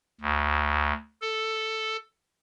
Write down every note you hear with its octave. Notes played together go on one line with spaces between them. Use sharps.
D2
A4